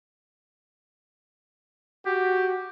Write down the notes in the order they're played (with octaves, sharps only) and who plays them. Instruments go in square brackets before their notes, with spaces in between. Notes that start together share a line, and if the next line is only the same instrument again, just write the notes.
[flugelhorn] F#4 [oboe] G4